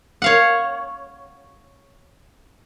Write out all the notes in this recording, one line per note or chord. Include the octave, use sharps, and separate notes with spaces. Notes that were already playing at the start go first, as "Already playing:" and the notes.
C#5 F5 F#5